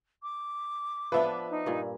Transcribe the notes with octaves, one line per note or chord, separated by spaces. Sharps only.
D6
F3 B3 D4 B4 E5
D#4
G2 A#2